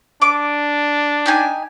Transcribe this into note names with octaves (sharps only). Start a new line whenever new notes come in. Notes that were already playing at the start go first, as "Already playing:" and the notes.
D4 D6
D#4 G4 G#5